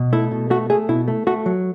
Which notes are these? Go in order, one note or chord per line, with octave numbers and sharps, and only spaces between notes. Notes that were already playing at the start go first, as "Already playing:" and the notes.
Already playing: B2
A3 E4
B2
A3 F#4
A3 G#4
B2 E4
A3
A3 F#4
F#3